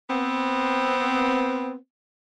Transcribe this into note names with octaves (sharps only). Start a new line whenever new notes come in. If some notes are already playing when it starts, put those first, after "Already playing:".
B3 C4